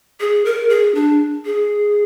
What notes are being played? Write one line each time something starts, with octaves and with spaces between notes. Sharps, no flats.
G#4
A#4
G#4
D4
G#4